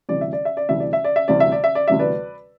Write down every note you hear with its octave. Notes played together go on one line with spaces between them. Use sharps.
D2 C3 E3 G3 D5
E5
D5
E5
D5
D2 C3 E3 G3 E5
D5
E5
D5
E5
D2 C3 E3 G3 D5
E5
D5
E5
D5
D2 C3 E3 G3 E5
B4 D5